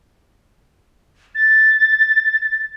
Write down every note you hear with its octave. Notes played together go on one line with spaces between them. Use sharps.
A6